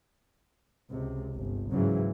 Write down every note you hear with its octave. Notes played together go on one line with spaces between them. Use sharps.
C#2 C3
G1
G#2 C#3 E3 F#3